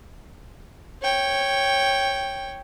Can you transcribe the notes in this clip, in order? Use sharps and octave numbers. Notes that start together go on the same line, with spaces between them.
C#5 G5